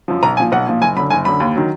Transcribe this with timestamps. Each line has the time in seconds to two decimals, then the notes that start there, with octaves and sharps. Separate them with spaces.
0.08 F#2 F3
0.23 B1 A#5
0.37 A#2 F3 G#5
0.52 B1 F#5
0.66 A#2 F3
0.81 F#1 G#5
0.97 F#2 D3 B5
1.10 F#1 G#5
1.25 F#2 D3 B5
1.40 D#2
1.56 D#3 F#3